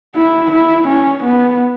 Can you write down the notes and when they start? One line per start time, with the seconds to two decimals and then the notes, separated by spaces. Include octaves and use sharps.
0.16 E4
0.52 E4
0.88 C#4
1.24 B3